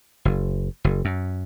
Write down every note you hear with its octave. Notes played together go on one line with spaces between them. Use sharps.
F#1
F#1
F#2